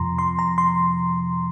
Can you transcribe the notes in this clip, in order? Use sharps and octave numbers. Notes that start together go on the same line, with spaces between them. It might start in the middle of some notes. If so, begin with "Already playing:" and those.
Already playing: F2 C3 F3 A#5 C6
C6
A#5
C6